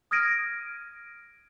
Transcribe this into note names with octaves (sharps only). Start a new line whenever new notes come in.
D#6 F6 G#6 A#6 D7 D#7